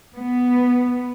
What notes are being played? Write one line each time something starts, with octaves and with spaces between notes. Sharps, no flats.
B3